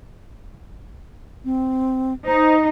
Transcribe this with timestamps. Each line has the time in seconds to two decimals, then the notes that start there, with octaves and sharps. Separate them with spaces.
1.45 C4
2.26 D#4 C5